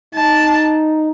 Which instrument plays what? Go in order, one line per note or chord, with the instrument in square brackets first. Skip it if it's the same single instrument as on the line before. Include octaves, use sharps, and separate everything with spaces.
[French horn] D#4 [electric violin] A5